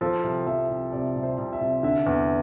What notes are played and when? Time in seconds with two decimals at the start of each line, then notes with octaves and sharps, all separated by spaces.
0.01 F3 A4
0.23 C2
0.47 F3 E5
0.69 C2
0.92 C3 D5
1.15 C2
1.23 C5
1.38 C2
1.53 E5
1.60 C2
1.83 D3 E5
2.06 E2